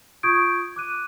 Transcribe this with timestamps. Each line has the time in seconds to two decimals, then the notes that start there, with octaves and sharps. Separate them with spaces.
0.23 F4 C#6 D#6 G6 G#6 D7
0.76 D6 F#6 D#7